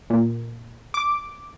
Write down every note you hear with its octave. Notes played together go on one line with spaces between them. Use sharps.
A#2
D6